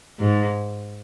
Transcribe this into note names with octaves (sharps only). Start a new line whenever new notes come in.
G#2